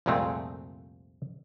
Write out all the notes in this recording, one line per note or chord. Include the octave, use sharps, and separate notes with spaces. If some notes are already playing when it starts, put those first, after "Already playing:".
C2 F2 A#2 G#3 A3 C4